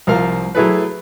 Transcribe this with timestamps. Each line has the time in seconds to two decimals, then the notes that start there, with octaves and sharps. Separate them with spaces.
0.07 C2 F3 A#4 F5
0.55 F#3 A3 E4 G#4 A4 B4